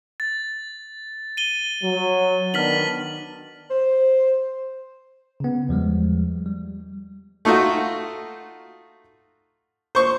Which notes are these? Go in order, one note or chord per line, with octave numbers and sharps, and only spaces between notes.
A6
D#7 G7
F#3
D#3 B3 D4 F6 B6 F#7
C5
C#3 B3
E2 F3 G3 G#3
G3
A3 D#4 F4 F#4
C5 C#6